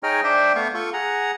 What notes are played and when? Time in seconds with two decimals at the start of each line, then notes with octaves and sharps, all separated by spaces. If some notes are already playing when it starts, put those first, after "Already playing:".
0.03 D#4 G#4 C#5 D#5 G5 F6
0.24 D4 C5 E5 G5 C6
0.55 A3 B3 F5 C#6
0.74 F4 A4 C#6
0.93 G#4 F#5 A#5